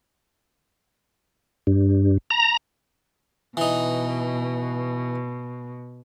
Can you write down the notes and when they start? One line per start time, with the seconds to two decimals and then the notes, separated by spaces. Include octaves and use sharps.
1.67 G2
2.30 A#5
3.57 B2 E3 D#4